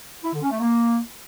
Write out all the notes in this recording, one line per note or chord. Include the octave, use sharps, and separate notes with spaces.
E4
D3
C#4
A3
A#3